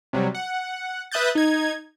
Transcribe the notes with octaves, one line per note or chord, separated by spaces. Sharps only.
C3 F#3 G3
F#5
B4 E5 D#6 F#6 G6 A6
D#4 G#6